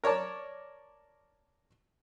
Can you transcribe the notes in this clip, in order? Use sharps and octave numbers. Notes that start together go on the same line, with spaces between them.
A#4 C#5 D5 A5